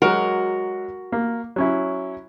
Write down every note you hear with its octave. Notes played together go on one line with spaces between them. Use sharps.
F#3 G#3 F#4 A#4
A#3
F#3 C#4 E4